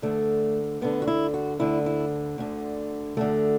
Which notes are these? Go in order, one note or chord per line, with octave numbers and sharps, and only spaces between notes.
D2 D3 A3
D2 D3 B3
F#4
E4
F#4
D2 D3 E4
E4
D2 D3
D2 D3 A3